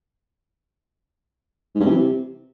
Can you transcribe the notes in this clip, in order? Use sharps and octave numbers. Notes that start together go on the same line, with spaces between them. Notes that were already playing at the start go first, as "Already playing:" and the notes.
G#2
G2
C3
E3
C3